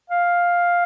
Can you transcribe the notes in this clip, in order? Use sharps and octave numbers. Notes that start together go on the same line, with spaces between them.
F5